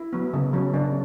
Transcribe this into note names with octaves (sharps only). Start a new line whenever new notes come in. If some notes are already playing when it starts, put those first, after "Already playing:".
Already playing: E4
F#3 B3
C#3
F#3 C#4
C#3 D4